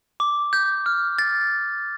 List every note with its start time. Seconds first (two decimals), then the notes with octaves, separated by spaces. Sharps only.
0.20 D6
0.53 G6
0.86 F6
1.18 A6